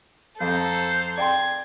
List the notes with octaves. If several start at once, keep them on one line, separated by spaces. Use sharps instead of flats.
F2 A4 C5 A#5
D5 G5 C6 G#6